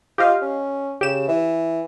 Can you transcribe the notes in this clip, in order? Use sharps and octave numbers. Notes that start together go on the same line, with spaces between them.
F4 G4 D#5 F5
C#4
C#3 G4 E7
E3